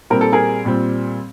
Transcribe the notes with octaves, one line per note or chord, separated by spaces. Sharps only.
A#2 G3 C4 A#4
A4
G#4 A#4
A#2 G3 C4